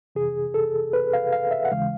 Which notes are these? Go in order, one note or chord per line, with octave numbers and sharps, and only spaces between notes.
F2 C3 E3 G#4
A4
B4
F5
F5
E5
F#5
D#2 C#3 E3 G#3 F5